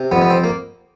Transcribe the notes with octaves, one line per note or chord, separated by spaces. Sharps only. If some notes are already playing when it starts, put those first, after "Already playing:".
Already playing: C3
F2 B3
B3
C4
A#3